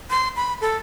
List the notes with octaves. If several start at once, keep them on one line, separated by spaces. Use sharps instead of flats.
C6
B5
A4